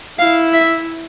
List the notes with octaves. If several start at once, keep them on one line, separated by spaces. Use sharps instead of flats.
E4 F5
E5